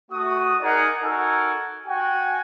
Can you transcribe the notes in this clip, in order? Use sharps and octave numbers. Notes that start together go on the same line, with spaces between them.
A3 F#4 D#6
D#4 G#4 A#4 D5 D#5 F#5
D#4 F#4 A4 A#4 F#5 G#5
F#4 G5 G#5